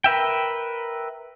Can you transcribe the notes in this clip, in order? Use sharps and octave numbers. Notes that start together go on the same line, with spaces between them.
A#4 B4 E5 G5